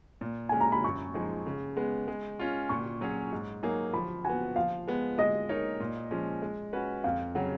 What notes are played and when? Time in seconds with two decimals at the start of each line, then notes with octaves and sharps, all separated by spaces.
0.21 A#2
0.49 G#3 C#4 G#5
0.61 A#5
0.72 B5
0.84 F#2 C#6
1.14 F3 G#3 D#4 G#4
1.46 C#3
1.77 G#3 B3
2.08 G#3
2.39 C#4 F4
2.69 A#2 C#6
3.01 F#3 C#4 G#4 C#5
3.32 G#2
3.63 F#3 A#3 D#4 G#4
3.93 F3 B5
4.25 B3 F#4 G#5
4.56 F3 F5
4.87 G#3 B3
5.18 G#3 D#5
5.49 D#4 A#4 C#5
5.80 A#2
6.11 F3 G#3 C#4
6.42 G#3
6.73 C#4 F#4 B4
7.04 F2 F5
7.35 C#3 F#3 F#5